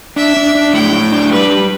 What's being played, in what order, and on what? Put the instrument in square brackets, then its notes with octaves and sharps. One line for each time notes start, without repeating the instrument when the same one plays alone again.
[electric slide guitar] D4 [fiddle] E5
[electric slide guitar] D4
D4
[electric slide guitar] A2 [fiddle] G5
[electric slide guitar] A2
D4
[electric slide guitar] G3 [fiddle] B4
[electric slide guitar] G3